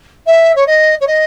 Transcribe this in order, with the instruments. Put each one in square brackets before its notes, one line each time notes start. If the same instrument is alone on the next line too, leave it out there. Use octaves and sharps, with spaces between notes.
[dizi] E5
C#5
D#5
C#5
D#5